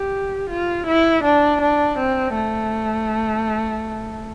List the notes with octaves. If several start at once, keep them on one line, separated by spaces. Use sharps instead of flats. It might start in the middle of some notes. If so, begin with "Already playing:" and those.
Already playing: G4
F4
E4
D4
D4
C4
A3